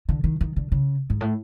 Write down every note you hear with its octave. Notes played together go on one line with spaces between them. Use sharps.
D3
D#3
D#3
D3
C#3
G#2
A2